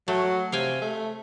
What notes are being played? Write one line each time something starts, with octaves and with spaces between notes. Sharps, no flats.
F#3 A3
C3 F5 G5 G#5
A3